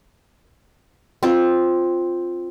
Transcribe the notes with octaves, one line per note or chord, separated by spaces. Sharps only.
C4 F4